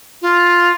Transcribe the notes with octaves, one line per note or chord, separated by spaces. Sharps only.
F4